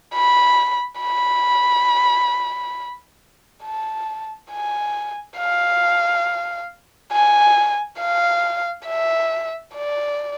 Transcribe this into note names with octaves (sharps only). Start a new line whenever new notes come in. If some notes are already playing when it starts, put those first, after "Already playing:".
B5
B5
A5
G#5
F5
G#5
F5
E5
D5